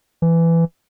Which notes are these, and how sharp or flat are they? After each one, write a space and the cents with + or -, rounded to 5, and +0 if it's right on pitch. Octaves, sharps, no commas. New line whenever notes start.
E3 +15